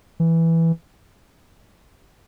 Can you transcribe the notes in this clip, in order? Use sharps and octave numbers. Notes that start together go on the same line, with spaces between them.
E3